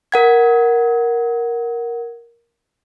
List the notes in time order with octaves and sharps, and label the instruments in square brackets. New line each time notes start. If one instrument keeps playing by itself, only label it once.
[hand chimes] A#4 F#5 G#6